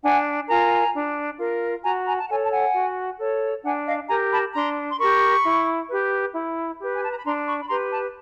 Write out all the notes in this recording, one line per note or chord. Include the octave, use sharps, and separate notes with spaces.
D4 F#5 G#5
F4 A#4 G#5 A#5
D4
F4 A#4
F#4 G#5 A#5
G#5 A#5
A5
A4 C#5 F#5 G#5
A5
F#5 G#5
F#4
A4 C#5
D4 F#5 G#5
D#5 F5
G4 A#4 G#5 A#5
A5 B5
D4 A#5 C6
C6
G4 A#4 B5 C#6
E4
G4 B4
E4
G4 B4
G#5
A5
A#5
B5
D4 A#5 C6
B5 C#6
B5
G4 B4 A#5 C6
A5 B5